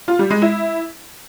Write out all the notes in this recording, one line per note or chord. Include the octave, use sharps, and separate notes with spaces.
F4
G3
G#3
E4